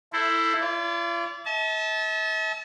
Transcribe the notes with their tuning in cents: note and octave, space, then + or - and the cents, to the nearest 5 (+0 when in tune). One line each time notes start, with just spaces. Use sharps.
E4 +0 A4 +15 C5 +0
F4 -45 D5 -30
E5 -45 A5 -20